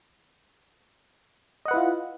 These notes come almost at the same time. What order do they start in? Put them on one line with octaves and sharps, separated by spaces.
D#5 F#5 B4 E4 F4